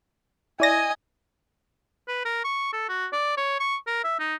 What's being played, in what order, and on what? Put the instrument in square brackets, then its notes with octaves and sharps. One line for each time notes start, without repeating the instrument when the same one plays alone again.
[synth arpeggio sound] E4 D5 A#6 [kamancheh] D#5 G#5
[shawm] B4
A#4
C#6
A4
F#4
D5
C#5
C#6
A#4
E5
D#4